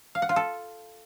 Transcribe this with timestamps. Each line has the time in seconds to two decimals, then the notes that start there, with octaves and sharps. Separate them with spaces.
0.15 F5
0.22 F#5
0.29 F4
0.36 A4